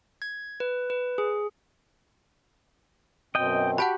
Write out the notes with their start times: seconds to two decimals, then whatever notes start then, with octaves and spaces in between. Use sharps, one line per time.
0.22 G#6
0.60 B4
0.90 B4
1.18 G#4
3.35 F#2 B2 C4 D#5 G5
3.78 F#4 G4 F#5 A5 B5